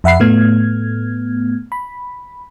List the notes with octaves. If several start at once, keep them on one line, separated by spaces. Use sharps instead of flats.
F2 E5 F#5 B5 C7
A2 A3 B3 F6 G#6
B5